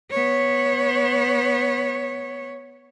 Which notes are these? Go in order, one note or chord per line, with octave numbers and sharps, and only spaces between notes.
B3 C#5